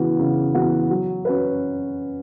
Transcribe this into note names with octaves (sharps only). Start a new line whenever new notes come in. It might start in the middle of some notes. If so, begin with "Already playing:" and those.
Already playing: C#3 E3 B3 F#4
C#3
E3 B3 F#4
F#3
C#4 F#4 B4